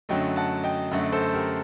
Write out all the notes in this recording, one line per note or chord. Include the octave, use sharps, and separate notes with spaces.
F#2 D3 F#3 A3 D#5 G5
F#5 A5
D#5 G5
F#2 D3 F#3 A3
A4 C5
G4 A#4